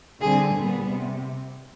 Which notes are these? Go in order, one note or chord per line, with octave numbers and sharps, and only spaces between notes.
D3 G3 C4 G#4
A#2 G3 B3
C3